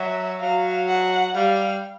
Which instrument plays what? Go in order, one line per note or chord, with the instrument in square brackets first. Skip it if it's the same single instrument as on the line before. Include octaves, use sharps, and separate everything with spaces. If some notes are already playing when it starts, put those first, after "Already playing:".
Already playing: [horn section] F#3 [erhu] E5
[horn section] F#3 [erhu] F5
[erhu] F#5
[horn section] G3 [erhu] F5